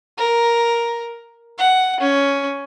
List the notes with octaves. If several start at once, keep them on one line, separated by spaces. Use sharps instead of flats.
A#4
F#5
C#4